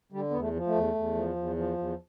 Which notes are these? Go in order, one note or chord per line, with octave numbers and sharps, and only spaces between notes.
D3 G3
E2 B3
A3
F3
A3
E2
E2
F3
E2
F3
E2